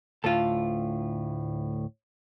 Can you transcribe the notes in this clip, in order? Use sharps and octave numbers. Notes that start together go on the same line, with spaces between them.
D2 A2 F4 A4